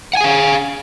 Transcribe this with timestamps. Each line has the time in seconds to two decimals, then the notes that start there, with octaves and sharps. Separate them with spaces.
0.13 F#5
0.17 G#5
0.21 G#4
0.24 F5